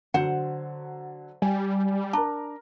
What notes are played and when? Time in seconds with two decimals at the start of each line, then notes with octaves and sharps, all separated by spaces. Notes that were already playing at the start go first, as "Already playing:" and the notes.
0.14 D3 F#3 C5 F#5
1.42 G3 G5 G#5
2.13 D4 A#4 A#5